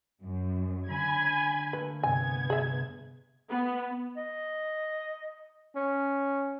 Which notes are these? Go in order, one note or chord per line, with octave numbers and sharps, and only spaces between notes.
F#2
D3 G#5 B5 G#6
A3 A#3 B4 C#5
G2 C3 B3 G#5 G#6
G#4 E5
B3
D#5
C#4